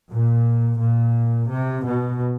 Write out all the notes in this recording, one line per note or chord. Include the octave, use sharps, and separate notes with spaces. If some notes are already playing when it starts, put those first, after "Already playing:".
A#2
A#2
C3
B2